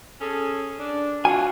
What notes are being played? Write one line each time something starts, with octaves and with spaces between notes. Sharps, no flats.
C#4 G#4 A4
D4
F4 F#4 G#5